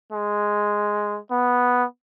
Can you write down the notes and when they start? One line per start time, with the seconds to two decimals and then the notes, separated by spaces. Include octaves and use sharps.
0.13 G#3
1.31 B3